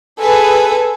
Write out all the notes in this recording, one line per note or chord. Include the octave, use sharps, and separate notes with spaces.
G#4 A4 B4 G#5